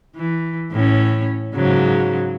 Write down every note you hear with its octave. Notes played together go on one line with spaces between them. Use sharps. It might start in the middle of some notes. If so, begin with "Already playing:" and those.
E3
A2 C#4
G#2 C#3 F#3